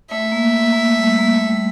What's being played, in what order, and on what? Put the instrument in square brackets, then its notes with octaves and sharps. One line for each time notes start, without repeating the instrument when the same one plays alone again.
[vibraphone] A3 [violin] E5
[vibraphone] A#3
A#3
A#3
A3
G3
A3
A#3
A3
G3